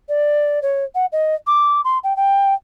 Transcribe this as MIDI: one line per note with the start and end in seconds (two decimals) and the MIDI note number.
0.08 0.59 74
0.62 0.84 73
0.95 1.05 78
1.12 1.35 75
1.47 1.81 86
1.84 1.98 84
2.03 2.16 79
2.16 2.54 79